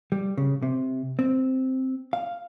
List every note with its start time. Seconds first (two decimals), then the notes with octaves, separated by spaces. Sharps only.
0.12 G3
0.37 C#3
0.62 C3
1.19 C4
2.13 F5